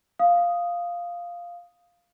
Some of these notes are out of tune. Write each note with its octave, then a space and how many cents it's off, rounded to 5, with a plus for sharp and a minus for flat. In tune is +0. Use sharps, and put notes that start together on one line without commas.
F5 +0 D#6 +0